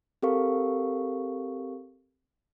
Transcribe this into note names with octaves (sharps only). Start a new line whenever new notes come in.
C4 G4 A4 A#4 F5 C#6